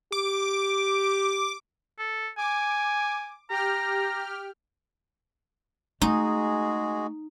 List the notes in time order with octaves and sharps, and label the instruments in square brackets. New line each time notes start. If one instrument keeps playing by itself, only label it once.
[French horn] G4 [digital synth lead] D6
[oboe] A4
[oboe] G#5 [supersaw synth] D6
[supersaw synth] G4 G5 F6 [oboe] A#5
[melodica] G#3 F#4 G#4 [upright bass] A3 [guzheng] D#4